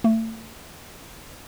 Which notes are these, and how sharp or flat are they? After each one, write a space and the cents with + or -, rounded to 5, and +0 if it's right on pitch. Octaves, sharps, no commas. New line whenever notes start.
A3 +35